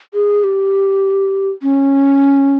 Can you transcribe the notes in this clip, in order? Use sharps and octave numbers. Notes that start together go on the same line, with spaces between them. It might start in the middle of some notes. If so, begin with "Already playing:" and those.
G#4
G4
C#4